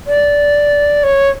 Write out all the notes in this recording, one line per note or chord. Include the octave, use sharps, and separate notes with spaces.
D5
C#5